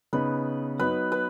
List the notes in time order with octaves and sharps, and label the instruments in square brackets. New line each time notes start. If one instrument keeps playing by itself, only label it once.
[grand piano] C#3 B3 D#4 [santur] B4
[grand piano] F#3 B3 D#4 [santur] B4
[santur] B4